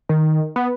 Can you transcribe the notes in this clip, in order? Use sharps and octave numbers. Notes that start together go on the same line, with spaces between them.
D#3
B3